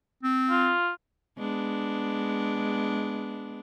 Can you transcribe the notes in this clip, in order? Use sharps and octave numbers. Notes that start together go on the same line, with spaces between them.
C4
F4
G#3 B3 D4